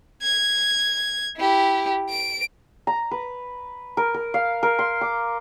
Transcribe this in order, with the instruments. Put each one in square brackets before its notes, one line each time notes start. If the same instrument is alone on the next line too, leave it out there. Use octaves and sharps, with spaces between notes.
[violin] G#6
E4 G4
D7
[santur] A#5
B4
A#4
A#4
F5
A#4
C6
D6